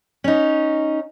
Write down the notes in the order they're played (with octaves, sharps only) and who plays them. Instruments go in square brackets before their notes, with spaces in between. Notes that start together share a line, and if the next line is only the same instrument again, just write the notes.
[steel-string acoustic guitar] C#4 D#4